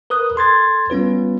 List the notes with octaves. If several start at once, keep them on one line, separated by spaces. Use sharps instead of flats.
A#4 B4 D#6 F#6
A4 C6 G#6 A6
G3 B3 C#4 F4 B4